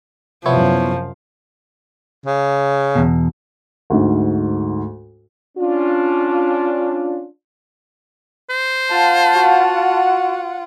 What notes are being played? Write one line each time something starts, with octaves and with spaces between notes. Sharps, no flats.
F#2 C3 F3 B3 E4 C#5
C#3
E2 B2
D2 G#2
C#4 D4 F4
C5
F4 F5 F#5 A5
F#4